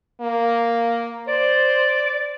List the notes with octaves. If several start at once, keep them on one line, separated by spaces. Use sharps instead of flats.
A#3
C5 D5